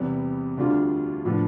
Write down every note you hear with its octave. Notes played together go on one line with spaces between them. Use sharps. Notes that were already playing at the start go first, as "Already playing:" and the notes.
Already playing: E2 C3 G3 B3
D2 D3 G3 D4 F4
A2 F3 B3 D4